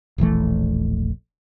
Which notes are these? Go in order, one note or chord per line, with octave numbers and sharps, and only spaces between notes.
E1 A#1 E3 A3